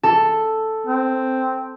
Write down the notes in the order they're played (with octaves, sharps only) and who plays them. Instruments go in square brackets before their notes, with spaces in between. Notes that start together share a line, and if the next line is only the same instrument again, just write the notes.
[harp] A4
[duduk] C4